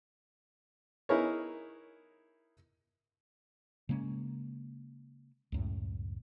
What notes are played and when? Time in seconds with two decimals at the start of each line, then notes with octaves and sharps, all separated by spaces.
1.09 D#4 E4 G#4 A#4 B4 C#5
3.89 C#3 G#3 A#3 C#4
5.52 C#2 F#2 A2